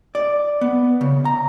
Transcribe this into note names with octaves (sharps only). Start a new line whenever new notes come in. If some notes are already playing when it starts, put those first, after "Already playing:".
D5
B3
C#3
A#5